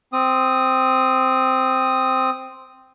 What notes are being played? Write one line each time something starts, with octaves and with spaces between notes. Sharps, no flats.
C4 D#6